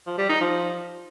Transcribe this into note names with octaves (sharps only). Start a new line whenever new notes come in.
F3
G3
D#4
F3